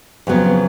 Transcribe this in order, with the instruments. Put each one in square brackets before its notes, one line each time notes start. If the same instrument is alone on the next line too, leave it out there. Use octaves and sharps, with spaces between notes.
[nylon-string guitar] F2 C#3 F#3 B3